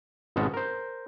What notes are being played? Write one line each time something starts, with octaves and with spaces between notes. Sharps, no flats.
G#1 B2 G#3 C#4 F#4 A5
A#4 C5